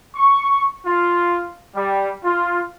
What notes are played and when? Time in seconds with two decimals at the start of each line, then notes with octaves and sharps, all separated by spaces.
0.15 C#6
0.86 F4
1.75 G3
2.25 F4